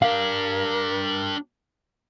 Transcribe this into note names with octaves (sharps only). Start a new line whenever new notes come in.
D4 G4 A#4 F5